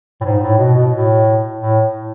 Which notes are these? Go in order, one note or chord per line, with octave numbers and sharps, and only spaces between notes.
A2
G#2
A2
B2
B2
A2
A2